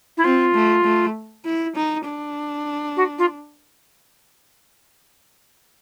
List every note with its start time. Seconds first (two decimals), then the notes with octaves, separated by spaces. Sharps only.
0.17 E4
0.24 C4 F4
0.54 A3
0.85 A3
1.45 E4
1.76 D#4
2.05 D4
2.96 F#4
3.18 F4